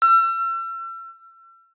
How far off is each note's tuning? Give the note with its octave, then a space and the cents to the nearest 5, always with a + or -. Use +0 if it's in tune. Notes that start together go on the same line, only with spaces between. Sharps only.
E6 +40